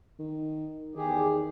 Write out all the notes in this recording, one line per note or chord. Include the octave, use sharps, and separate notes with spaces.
D#3
E2 D#3 G4 G#4